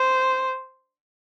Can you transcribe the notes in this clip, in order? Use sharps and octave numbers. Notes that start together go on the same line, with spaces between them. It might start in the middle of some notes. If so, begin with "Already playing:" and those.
Already playing: C5